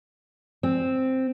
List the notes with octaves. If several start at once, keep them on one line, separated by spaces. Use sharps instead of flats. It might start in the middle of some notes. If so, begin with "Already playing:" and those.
C4